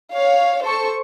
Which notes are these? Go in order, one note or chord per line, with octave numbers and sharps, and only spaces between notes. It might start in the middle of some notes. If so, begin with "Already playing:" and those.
C#5 F5
A4 C5 C#6